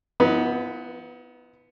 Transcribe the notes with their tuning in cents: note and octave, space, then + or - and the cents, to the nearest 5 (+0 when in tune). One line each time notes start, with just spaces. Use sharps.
F3 -20 B3 +0 D#4 +40